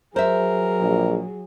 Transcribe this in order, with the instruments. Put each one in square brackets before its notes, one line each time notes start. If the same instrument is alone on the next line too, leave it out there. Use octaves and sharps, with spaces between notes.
[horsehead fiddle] F#3 G#4 [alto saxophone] A#4 [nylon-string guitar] C5 E5
[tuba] A#1